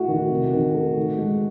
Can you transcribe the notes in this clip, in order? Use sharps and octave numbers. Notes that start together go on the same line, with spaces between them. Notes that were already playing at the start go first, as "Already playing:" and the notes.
Already playing: A3 E4 F#4
D#3
C3
D#3
A3
D#3
G#3